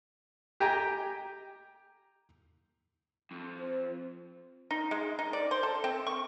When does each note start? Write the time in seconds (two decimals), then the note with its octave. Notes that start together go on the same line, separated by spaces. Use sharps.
0.60 G4 G5 G#5 A#5
3.31 F2
3.59 C5
4.71 D#4
4.91 G#3
5.19 D#4
5.33 D5
5.51 C5
5.63 A4
5.84 C4
6.07 C#6